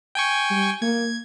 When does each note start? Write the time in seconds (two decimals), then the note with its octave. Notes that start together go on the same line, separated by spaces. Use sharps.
0.15 G5 G#5 C#6
0.51 G3
0.82 A#3 G#6